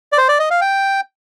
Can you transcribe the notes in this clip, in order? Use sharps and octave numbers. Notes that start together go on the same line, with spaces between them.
D5
C5
D5
D#5
F5
G5